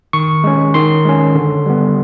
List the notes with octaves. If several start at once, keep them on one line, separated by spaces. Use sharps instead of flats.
D#3 C#6
G#3 C#4
D#3 C6
G#3 C#4
D3
G3 B3